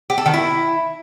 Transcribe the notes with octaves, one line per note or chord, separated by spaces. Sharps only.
G4
A4
D#3
E4